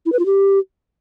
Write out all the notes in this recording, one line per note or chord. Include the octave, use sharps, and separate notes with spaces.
E4
B4
F4
G4